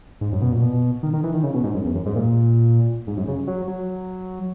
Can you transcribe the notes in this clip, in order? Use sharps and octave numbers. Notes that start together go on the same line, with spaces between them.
G#2
F#2
B2
A#2
B2
D#3
D#3
E3
D#3
C#3
B2
G#2
F#2
E2
F#2
G#2
A#2
G#2
F#2
C#3
F#3
F#3